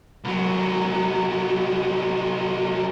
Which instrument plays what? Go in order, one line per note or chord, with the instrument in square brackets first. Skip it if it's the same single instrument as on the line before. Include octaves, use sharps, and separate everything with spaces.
[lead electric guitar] C2 F#3